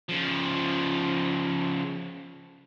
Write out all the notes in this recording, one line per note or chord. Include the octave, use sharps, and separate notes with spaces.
C#3 F3